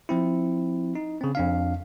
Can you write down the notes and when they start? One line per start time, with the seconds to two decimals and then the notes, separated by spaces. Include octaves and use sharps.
0.09 F3 C4 E4
0.95 D#4
1.21 C#3 C4
1.35 F2 D4 F5